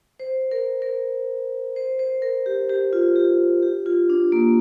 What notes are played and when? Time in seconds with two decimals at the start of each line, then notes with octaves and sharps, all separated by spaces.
0.19 C5
0.51 A#4
0.82 A#4
1.76 C5
1.99 C5
2.22 A#4
2.46 G4
2.69 G4
2.93 F4
3.16 G4
3.62 G4
3.86 F4
4.10 D4
4.32 A#3